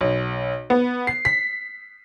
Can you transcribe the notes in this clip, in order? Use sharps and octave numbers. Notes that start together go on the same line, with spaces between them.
B1
B3
C7
B6